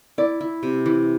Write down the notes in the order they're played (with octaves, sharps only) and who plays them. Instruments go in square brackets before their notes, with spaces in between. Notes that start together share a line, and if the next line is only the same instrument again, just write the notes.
[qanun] E4 [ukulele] D5
[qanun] E4
C3
E3